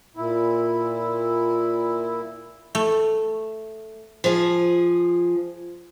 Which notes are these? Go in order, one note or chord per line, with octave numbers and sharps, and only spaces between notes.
A#2 E4
A3
F3 G#4